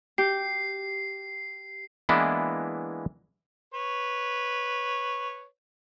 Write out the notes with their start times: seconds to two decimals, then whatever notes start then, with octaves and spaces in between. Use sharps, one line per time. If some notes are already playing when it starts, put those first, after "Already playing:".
0.18 G4 C7
2.09 E3 G#3 A#3 B3 D4 E4
3.74 B4 C#5